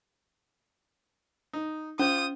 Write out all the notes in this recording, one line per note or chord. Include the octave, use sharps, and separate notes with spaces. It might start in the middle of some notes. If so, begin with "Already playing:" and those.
D#4
C#4 F4 C5 D#6